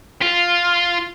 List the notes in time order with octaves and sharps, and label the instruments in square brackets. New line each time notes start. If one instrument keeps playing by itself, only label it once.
[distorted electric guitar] F4